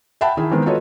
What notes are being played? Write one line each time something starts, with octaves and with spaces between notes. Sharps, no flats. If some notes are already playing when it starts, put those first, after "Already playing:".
E5 F#5 G5 A5 B5
D#3 E4 G#4
D#3 G#3 B3 C4
F4 F#4 A4 B4 C#5 D#5